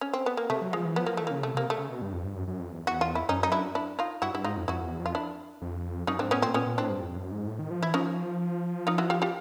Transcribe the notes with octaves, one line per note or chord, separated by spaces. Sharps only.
C#4
C4
B3
A#3
C3 A3
F#3
F3 G#3
E3
F3 B3
F3 A#3
E3 A3
C#3 A#3
C3 A3
C3 A#3
A3
C#3
B2
G2
F2
G2
F#2
F#2
F2
E2
F#4
F4
E4
F#2 C#4 D#4
D#4
D4 E4
D4 E4
D#4 F4
G2 E4 F#4
G2 E4
G#2 D#4 F4
F2
F2 E4 F#4
E2
F2
F4
D4 E4
F2
F#2 C#4 D#4
G#2 C4 D4
A2 B3 C#4
A#2 C4
A#2 B3 C#4
A#2
A2 C4 D4
G2
F2
F#2
G#2
A2
D#3
F3
E3 E4
F3 C#4 D#4
D#4 F4
E4 F#4
F4 G4
F4 G4